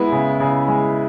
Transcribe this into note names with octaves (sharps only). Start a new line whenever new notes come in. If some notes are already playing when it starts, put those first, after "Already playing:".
Already playing: G#3 B3 E4
C#3
C#3
G#3